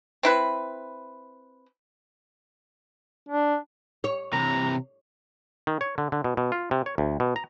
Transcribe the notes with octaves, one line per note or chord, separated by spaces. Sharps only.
C4 E4 B4
D4
C#5
C3 E3 A#5
D#3
C#5
D3
D3
B2
B2
F4
C3
C#5
D2
B2
A#5